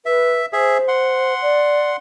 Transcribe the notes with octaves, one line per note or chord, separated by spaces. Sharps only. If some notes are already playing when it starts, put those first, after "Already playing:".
B4 E5
G#4 C5 E5
F#5 C6
D5